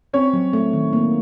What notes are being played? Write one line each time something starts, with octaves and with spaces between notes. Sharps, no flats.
C4 C#4 C#5
F#3
A3
D#3
A#3